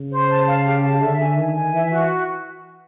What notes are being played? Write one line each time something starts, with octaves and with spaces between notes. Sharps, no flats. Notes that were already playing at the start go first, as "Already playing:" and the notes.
Already playing: C#3
C5
A5
F5
G4
A5
D3 E5
G#5
D#3 G#5
G#5
E3 E5
F#4